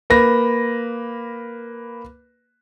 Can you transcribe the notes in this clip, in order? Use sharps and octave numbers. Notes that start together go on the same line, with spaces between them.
A#3 B4 A#6